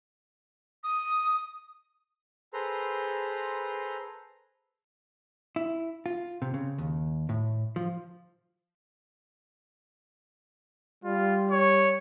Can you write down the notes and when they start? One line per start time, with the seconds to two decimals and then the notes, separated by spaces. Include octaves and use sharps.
0.84 D#6
2.54 G#4 A4 B4 C5 A#5 C6
5.56 E4
6.06 F4
6.42 C3
6.54 C#3
6.78 D#2
7.29 A2
7.76 F3
11.04 G3 F4
11.52 C#5